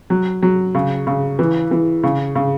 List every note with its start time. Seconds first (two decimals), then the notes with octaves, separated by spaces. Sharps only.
0.10 F#3
0.43 F#3
0.75 C#3
1.07 C#3
1.39 E3
1.71 E3
2.03 C#3
2.35 C#3